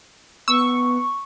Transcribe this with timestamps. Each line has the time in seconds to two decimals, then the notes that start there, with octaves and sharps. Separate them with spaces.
0.48 B3 C#6 E6